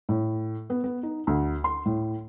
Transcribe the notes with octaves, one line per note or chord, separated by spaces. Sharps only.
A2
B3
B3
D#4
D2
C6
A2